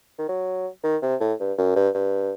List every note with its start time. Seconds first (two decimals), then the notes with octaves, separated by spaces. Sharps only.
0.18 D#3
0.29 F#3
0.84 D#3
1.02 C3
1.21 A2
1.40 G2
1.58 F#2
1.76 G2
1.94 G2